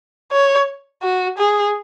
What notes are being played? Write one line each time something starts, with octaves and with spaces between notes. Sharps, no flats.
C#5
F#4
G#4